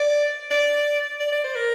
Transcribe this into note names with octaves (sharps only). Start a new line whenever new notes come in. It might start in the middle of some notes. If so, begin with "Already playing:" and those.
Already playing: D5
D5
D5
D5
C5
A#4